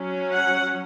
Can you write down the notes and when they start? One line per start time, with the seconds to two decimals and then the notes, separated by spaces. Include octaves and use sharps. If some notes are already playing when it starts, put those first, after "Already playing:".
Already playing: F#3 C#4
0.34 F#5